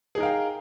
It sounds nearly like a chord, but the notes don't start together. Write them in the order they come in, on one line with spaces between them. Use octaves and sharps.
G#4 D#4 A#4 F5 G5